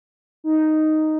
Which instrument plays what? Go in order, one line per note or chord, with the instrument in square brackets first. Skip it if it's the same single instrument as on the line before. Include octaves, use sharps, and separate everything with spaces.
[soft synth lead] D#4